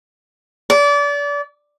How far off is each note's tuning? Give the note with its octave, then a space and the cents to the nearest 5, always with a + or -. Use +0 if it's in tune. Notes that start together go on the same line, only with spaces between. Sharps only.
D5 -30